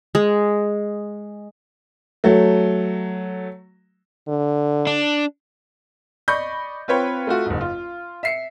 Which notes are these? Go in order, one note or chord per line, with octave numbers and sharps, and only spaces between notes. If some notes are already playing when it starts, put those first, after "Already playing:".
G#3
F#3 A3
D3
D4
D5 D#5 B5 C#6 G6
C4 F4 B4 C#5 G5
A3 F4 F#4
F#1 G#2
F4
E5 C7 C#7